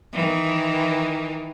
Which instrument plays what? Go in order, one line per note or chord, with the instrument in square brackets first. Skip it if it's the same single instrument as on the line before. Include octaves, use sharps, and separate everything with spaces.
[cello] D#3 E3